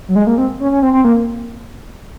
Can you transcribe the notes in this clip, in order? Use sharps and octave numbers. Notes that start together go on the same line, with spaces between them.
F#3
G#3
A#3
C4
C#4
C#4
C4
C4
A#3